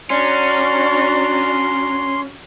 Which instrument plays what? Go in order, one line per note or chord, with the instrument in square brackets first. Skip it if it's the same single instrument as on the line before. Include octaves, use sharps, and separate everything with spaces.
[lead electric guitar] C#4 [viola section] D4 F#4 A#5 [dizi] D5 [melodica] C6